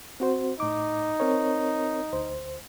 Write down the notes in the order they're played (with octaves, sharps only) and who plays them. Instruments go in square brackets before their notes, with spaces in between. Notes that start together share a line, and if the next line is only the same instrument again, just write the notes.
[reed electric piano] C4 F#4 C5
[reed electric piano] A2 D6 [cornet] D#4
[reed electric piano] C4 A#4 C#5
D2 C5